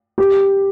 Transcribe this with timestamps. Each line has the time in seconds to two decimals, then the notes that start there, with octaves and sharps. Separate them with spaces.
0.18 G4